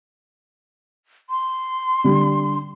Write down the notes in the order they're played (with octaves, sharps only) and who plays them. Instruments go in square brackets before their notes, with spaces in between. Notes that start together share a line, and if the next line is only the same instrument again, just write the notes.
[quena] C6
[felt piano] D3 G3